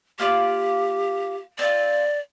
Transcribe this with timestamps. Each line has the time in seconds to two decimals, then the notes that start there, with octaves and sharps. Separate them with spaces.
0.19 A#3 F4 G4 D5
1.59 C4 F4 D5